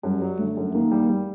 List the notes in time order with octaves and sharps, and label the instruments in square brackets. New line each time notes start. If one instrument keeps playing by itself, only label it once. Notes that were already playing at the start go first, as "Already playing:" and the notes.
[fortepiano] F#2 [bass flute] G3
[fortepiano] F#3
[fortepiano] D3 [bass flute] A3
[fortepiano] F#2
[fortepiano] D#3 [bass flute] A#3
[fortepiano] G3
G3